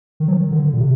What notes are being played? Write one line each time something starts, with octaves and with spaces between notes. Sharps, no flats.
D#3
F#3
D#3
D3
A#2
C3